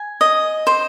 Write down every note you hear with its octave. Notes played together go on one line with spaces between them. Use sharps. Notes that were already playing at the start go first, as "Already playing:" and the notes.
Already playing: G#5
D#5
C5